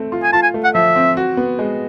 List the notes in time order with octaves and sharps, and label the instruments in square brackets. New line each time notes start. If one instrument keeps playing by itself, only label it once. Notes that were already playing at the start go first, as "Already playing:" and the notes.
Already playing: [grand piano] A3 C4
F4
[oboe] G#5
[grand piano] F4 [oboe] A5
[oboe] G#5
[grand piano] A3
[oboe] F#5
[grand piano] F3 [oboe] E5
[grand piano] C4
F#4
B3
G#3